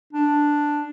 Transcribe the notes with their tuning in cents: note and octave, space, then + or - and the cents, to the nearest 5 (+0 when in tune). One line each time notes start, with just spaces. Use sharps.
D4 +0